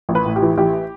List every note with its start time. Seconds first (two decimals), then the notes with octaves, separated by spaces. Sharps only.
0.09 A1
0.15 B4
0.26 A2
0.36 G4
0.42 E3
0.57 A1 G4